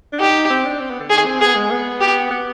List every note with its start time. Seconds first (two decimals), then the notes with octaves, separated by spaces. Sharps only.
0.13 D4
0.19 D#4 G4
0.50 C4
0.65 D4
0.80 C4
0.90 B3
1.00 D3
1.10 D#3 G#4
1.26 C4
1.41 B3 G#4
1.56 G#3
1.71 B3
2.01 G4
2.31 B3